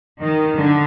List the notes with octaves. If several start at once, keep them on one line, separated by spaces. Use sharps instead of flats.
D#3
D3